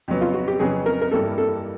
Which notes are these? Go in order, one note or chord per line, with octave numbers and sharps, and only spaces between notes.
F2 C#3 F#3 B3
F4
F#4
G4
F2 C#3 F#3 B3 G#4
A#4
A#4
G2 E3 G3 A#3 A4
A4